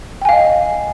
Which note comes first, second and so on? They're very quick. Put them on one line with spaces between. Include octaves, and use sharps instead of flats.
G5 G#5 F5 D#5